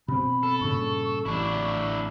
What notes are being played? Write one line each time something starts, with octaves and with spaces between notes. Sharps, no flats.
B2 C4 B5
A4
G2 A#2 C#3 C#6
A1 D4 E4